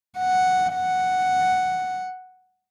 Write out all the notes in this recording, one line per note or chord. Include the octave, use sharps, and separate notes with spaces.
F#5
F#5